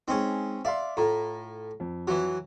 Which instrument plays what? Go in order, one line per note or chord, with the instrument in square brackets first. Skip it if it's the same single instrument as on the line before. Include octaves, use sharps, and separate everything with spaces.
[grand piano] G#3 D#4 [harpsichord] C4 C#4
[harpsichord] D5 [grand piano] E5 F5 C6
[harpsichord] A2 [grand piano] F4 A#5
[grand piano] F2
[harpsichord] E3 F#3